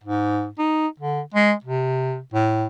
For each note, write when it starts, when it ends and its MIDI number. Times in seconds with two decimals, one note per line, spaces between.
0.03 0.49 44
0.59 0.87 63
1.00 1.21 50
1.34 1.53 56
1.64 2.19 48
2.34 2.66 45